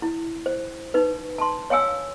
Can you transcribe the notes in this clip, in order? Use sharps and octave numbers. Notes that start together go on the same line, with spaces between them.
E4
C5
D#4 B4
A5 C6
C#5 F5 G5 G#5 E6